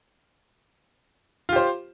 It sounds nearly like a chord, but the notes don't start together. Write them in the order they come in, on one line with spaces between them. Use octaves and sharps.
F4 G4 C5